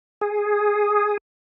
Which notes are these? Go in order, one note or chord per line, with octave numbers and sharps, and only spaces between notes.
G#4